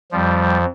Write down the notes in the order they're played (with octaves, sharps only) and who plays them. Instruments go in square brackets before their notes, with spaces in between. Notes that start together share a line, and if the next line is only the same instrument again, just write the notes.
[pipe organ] F2 F3 G3